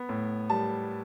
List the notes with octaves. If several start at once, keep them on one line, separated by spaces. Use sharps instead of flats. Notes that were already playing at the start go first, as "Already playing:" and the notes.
Already playing: B3
A2
G3 A5